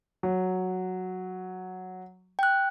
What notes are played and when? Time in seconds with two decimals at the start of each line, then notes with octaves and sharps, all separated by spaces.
0.23 F#3
2.39 G5 F#6